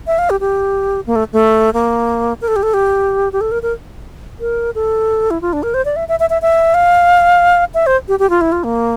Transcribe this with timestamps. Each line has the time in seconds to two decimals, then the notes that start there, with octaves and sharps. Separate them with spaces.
0.07 E5
0.19 F5
0.30 G4
0.40 G4
1.07 A#3
1.16 A3
1.33 A3
1.73 A#3
2.41 A#4
2.48 A4
2.56 G4
2.63 A4
2.74 G4
3.33 G4
3.41 A4
3.52 A#4
3.63 A#4
4.41 A#4
4.75 A4
5.31 E4
5.42 F4
5.53 D4
5.63 A#4
5.74 C5
5.85 D5
5.96 E5
6.09 E5
6.20 E5
6.30 E5
6.42 E5
6.74 F5
7.74 E5
7.87 C5
8.08 G4
8.19 G4
8.30 F4
8.41 E4
8.52 F4
8.64 A#3